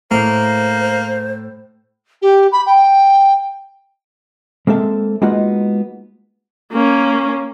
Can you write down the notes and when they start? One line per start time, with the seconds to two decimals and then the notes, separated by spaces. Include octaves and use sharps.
0.11 A2 A#3 C5
2.22 G4
2.52 B5
2.66 G5
4.67 G#3 A#3 C4 A4 E5
5.22 G#3 A#3 B3 D#4 F4 F#4
6.72 A#3 C#4